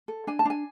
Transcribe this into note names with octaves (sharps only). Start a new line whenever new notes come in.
A4
D4 G#5
A5
D4 G#5